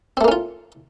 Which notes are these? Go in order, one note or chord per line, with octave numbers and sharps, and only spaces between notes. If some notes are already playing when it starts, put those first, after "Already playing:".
A3 A#3 C4 C#4 F4